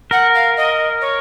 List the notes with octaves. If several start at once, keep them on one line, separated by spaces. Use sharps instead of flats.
A#4 F#5
F5
D#5
C#5